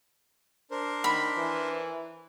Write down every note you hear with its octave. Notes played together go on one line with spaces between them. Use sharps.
D4 A#4 C5
D#3 B5
E3